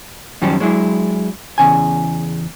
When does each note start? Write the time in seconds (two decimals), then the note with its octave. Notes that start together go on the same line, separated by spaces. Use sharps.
0.42 F#2 D#3 F3 G3 C#4 D4
0.60 F#3 G#3 D4 E4
1.58 E2 C#3 G#5